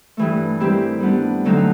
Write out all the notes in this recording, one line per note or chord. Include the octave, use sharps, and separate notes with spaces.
G2 E3 A3
D#3 G3 C4 E4 G4
G3 B3 D4
D3 F#3 A3 C4 D#4